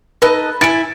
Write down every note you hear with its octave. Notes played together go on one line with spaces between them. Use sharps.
D#4 A4 B4 D#5
E4 G#5 A6 D7